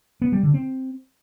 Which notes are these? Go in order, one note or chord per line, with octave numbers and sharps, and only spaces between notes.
B3
G3
D3
C4